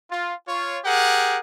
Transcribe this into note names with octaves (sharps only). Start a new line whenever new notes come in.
F4
F4 C#5
G4 G#4 A#4 F#5